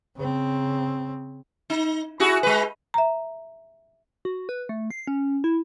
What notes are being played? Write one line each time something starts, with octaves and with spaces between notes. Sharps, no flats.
C#3 C4
D#4
E4 F#4 G#4
G#3 B4
E5 A#5
F#4
B4
A3
C7
C#4
E4